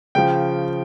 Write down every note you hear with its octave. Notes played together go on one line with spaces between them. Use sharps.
C#3 F3 G5